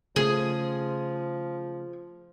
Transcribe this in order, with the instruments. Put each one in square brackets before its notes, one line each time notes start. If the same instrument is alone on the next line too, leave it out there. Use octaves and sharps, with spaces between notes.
[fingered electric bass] C#3 A3 C#4 [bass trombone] F3 [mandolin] G#4